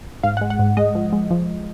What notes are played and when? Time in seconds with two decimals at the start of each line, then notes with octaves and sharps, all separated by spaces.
0.23 G#2 F5
0.37 F#5
0.41 G#3
0.50 F#5
0.59 G#2
0.77 G#3 D#5
0.95 F3
1.13 G#3
1.31 F3